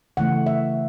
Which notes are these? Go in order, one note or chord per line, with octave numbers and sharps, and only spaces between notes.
C#3 E3 A3 F#5
E5